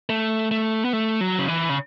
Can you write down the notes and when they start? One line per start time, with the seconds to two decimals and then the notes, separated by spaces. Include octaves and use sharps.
0.09 A3
0.51 A3
0.85 B3
0.93 A3
1.21 F#3
1.39 C#3
1.48 E3
1.69 C#3